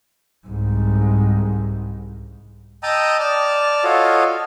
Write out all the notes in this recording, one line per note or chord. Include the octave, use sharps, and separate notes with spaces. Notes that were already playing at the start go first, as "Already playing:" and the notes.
C2 G#2
D#5 G5 A5 A#5 D#6 E6
D5 A5 F6
F4 F#4 A4 C#5 D#5 F5